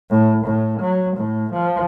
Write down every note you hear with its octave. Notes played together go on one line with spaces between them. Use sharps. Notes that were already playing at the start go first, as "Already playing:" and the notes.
A2
A2
F#3
A2
F3